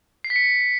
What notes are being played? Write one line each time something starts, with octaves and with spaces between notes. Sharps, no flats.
C7
B6
C#7